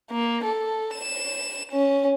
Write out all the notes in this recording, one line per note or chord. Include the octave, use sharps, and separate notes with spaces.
A#3
A4
E7
C#4